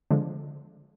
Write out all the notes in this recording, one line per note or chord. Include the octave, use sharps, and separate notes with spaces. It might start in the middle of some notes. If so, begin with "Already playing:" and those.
D3 F3 G#3